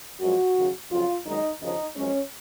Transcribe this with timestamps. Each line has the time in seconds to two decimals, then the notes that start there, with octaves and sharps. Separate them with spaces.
0.20 F#2 F3 G#3 F#4
0.56 D#2 C#3 F#3
0.91 F2 C#3 F#3 F4
1.26 F#2 D#3 G#3 D#4
1.61 D#2 C#3 F3 D#4
1.96 F#2 F3 G#3 C#4